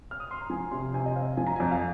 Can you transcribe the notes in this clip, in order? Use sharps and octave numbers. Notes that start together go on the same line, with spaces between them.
F6
D#6
C6
A#5
F3 G#5
C3 C6
C3 G#5
D#5
C4 F5
F3 G#5
A#5
F2 G#5
F5